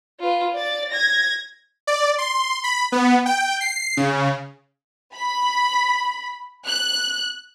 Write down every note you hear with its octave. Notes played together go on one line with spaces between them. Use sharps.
F4 B4
D5 A6
G#6 A#6
D5
C6
B5
B3
G5
C7
C#3
B5
F#6